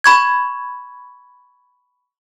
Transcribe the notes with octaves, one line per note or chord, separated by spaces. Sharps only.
B5 C#6 G#6